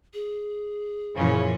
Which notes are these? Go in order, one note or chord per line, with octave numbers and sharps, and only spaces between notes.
G#4
F#2 A#2 C#3 E3 F3 C#4